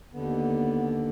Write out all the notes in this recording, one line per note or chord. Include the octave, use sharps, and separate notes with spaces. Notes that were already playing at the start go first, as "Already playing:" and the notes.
D#2 D3 B3